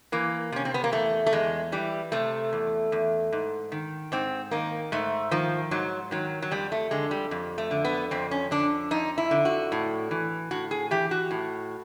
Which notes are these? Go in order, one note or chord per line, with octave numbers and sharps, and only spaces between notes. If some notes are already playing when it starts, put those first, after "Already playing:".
E3 A#3
C3 C#4
C4
B3
A#3
E2 A3
A3
E2 G#3
E3 G3
C3 A3
E2
E2
G#2
D#3
G#2 C4
D#3 A#3
G#2 A3
D#3 F3
G#2 F#3
D#3 F#3
F#3
F2 G3
A3
D3 G#3
G3
F2
A3
D3
B3
F2 C4
C#4
D3 D4
F2 D#4
E4
D3
F#4
A2
E3
A2 F#4
G#4
E3 G4
F#4
A2